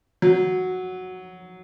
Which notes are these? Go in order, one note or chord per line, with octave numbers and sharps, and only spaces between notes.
F#3